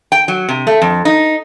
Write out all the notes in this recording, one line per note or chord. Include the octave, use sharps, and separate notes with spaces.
G5
F#3
C3
A3
F2
D#4